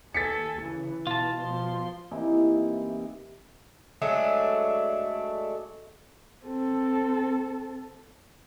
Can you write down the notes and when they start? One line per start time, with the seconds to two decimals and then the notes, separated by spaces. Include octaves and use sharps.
0.14 D#2 A4 G#5 A6 B6 C#7
0.62 C#3 E3
1.07 B2 F4 A5
1.40 F3 C6
2.11 C3 E3 A#3 D#4
4.02 F#3 G#3 A3 D4
6.45 C4 A4